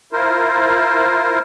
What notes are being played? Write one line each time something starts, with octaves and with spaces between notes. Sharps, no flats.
E4 F4 A#4 C5